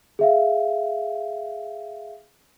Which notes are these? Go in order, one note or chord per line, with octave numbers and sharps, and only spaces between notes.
G#4 E5 F5